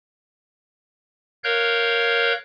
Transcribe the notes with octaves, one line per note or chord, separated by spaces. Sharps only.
A#4 C#5 F5 F#6 G6